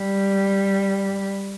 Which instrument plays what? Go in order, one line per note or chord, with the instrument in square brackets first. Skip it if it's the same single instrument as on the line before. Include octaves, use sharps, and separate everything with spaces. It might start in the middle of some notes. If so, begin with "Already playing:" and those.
Already playing: [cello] G3